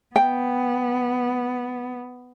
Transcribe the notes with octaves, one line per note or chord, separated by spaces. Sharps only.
B3 G5